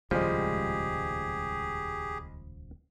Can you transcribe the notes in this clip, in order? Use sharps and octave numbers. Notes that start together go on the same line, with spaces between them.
D#1 C#2 A2 F3 G3 G#3 G4 G#4